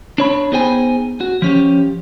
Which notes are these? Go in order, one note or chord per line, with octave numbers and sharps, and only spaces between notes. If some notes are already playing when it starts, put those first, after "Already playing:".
D4 C#5 B5
B3 D#4 G#4 C5 G5 G#5
F#4
F3 C#4 G4